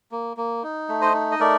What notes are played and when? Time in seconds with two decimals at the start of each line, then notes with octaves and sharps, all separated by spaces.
0.11 A#3
0.37 A#3
0.63 D#4
0.89 A3
1.01 C5 D#5
1.14 D#4
1.32 D#5
1.40 A3 A#4 D5